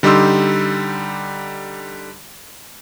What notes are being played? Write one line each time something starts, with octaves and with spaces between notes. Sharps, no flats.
D3 G3 D#4 G4 C6 E6